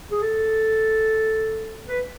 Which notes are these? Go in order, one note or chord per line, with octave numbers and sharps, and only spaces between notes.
G#4
A4
B4